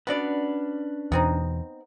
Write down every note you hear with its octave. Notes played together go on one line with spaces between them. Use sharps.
B3 C#4 D4 F#4 B4 D5
E2 B2 B3 C4 D#4